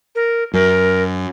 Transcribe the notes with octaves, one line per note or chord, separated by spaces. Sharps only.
A#4
F#2 A#4